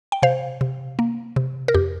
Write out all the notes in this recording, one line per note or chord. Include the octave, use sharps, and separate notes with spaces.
G5
C3 C5 F5
C3
A#3
C3
A#4
F2 G4